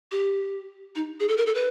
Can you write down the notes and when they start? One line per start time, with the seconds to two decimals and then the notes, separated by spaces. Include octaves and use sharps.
0.11 G4
0.95 D#4
1.20 G#4
1.28 A4
1.37 A#4
1.46 A4
1.55 B4